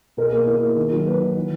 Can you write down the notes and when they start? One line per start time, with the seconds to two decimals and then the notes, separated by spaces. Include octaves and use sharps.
0.17 B2 A#4
0.27 G#4
0.32 A#3 A#4
0.47 E4 A#4
0.62 A#3
0.76 D#3
0.92 F#3
1.06 A#3 B4
1.21 D#3
1.36 E3